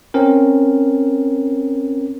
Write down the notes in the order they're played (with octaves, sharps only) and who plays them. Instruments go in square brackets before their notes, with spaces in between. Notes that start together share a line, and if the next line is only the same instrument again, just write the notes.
[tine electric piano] C4 C#4 A#4